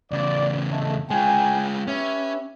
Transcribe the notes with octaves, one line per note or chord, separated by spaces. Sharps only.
E2 C#3 D5
G#3 A3
G#3 F4 G5 G#5
C#4 G4 B4 E5